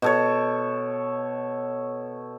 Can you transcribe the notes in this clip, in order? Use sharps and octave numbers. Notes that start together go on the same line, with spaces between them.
B2 A4 C#5